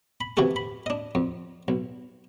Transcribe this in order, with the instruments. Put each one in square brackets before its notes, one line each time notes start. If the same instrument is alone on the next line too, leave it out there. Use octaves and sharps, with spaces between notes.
[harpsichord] B5
C3 E3 E4 F#4 G4 A4
B5
D4 D#5
F2
B1